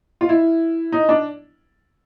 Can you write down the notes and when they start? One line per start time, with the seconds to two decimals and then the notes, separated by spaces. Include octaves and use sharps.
0.21 F4
0.29 E4
0.92 D#4
1.09 D4